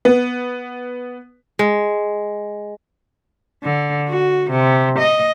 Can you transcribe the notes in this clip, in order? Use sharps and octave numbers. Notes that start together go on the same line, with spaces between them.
B3
G#3
D3
F#4
C3
D#5